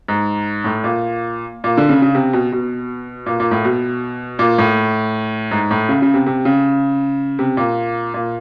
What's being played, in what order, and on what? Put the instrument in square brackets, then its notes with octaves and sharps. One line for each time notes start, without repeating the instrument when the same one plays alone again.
[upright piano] G#2
A2
A#2
A#2
D3
C#3
C#3
C3
B2
B2
A#2
A#2
A2
B2
A#2
A2
G#2
A2
C#3
C#3
C3
C3
C#3
C3
A#2
A#2